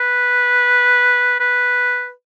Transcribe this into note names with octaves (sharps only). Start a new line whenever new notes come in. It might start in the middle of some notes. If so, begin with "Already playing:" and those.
Already playing: B4
B4